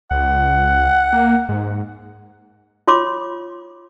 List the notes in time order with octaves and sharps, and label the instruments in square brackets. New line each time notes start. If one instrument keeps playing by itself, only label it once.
[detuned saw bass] C#2 [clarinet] F#5
[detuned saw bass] A#3
G#2
[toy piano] F4 C#5 C6 D6